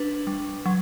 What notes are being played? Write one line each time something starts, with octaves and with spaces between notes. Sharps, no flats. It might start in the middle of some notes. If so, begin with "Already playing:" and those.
Already playing: D4 B4
G3
F#3